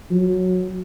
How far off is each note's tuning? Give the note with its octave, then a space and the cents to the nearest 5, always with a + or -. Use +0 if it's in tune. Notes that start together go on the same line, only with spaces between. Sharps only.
F#3 -10